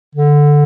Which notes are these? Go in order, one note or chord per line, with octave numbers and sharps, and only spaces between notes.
D3